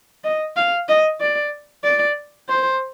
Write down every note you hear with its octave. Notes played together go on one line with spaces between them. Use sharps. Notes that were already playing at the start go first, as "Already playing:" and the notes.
D#5
F5
D#5
D5
D5
C5